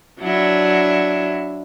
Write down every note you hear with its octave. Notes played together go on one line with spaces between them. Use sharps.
F#3 D4 E4